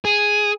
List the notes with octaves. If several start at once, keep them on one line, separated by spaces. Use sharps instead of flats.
G#4